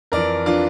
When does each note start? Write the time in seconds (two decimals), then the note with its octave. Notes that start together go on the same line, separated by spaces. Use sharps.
0.12 F2 E3 A#4 D5
0.46 E3 D4 F4